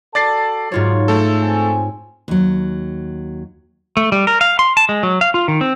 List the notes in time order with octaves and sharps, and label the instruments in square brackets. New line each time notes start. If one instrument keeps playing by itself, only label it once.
[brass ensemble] F#4 A4 A5 [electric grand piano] D5 A6 C7
[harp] G#2 F4 C#5 [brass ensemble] F#3
[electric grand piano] A3 A4
[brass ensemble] C4 G#5
[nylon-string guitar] D#2 F#3
[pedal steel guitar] A3
G3
A#4
F5
C6
A5
G#3
F#3
F5
F4
D#3
C4